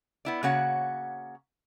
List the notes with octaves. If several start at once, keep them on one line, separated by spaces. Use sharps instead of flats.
B3 E4 D5
C#3 A#3 F#4 C#5 F#5